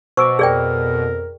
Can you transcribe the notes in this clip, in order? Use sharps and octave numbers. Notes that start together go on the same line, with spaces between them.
B2 C5 C#6 D6 E6 D7
F2 G#4 A#4 D5 G5